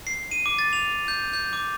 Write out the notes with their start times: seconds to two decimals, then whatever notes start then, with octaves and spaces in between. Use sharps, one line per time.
0.07 C7
0.31 D#7
0.46 D6
0.59 A6
0.73 F7
1.08 G6
1.33 G6
1.53 D6